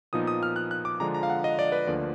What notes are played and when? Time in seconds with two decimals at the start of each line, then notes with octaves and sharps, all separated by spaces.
0.13 A#2 F3 B3 D#4 D#6
0.27 D#6
0.43 F6
0.56 F#6
0.71 F#6
0.85 D6
1.00 D3 F3 G#3 D4 A#5
1.14 A#5
1.23 F5
1.30 F#5
1.44 D#5
1.59 D5
1.72 B4
1.87 D2 D3 F3 A#3 D5